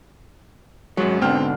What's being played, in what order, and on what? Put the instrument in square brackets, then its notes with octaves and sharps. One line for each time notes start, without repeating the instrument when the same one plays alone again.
[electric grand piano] G#1 G#3 [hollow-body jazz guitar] F#2 F#3
[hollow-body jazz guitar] G#2 B2 D3 [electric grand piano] C4 G5 F6